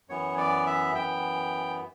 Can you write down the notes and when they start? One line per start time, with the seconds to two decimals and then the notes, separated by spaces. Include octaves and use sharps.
0.09 F#2 E3 B3 C#5
0.37 D5
0.66 E5
0.95 F#2 E3 B3 G5